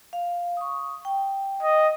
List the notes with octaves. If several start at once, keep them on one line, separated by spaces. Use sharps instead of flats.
F5
C#6 D#6
G5
D#5